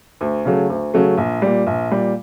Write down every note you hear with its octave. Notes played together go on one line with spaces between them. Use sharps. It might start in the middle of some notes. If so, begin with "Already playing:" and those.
D2
C#3 F#3 A3
D2
C#3 F#3 A3
A#1
A#2 G3
A#1
A#2 G3